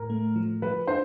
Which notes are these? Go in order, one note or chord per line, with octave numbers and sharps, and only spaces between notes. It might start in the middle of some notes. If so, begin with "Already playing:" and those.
Already playing: A2 A#4
A3
F3
F3 B4
D4 C5